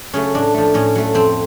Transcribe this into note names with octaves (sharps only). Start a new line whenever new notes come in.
C#3 F#3 A3 C#4
A2 D4
F3 A3
A2 C#4
F#3 A3
F2 C4